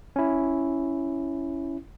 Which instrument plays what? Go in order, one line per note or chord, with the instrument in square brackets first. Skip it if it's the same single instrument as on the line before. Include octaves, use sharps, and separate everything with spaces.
[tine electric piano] C#4 E4